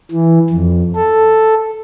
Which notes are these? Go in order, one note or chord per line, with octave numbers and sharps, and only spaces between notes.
E3
F2
A4